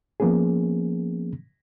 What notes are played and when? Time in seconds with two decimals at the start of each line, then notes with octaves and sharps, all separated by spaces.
0.20 F3 A#3 B3 C#4 G#4